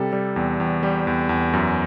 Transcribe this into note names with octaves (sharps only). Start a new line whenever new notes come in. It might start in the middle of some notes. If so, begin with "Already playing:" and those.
Already playing: C3 G3 A4
G3
E2
E2
G3
E2
E2
F#2